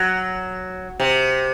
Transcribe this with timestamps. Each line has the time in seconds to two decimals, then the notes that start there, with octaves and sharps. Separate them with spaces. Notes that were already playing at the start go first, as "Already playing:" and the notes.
Already playing: F#3
1.00 C3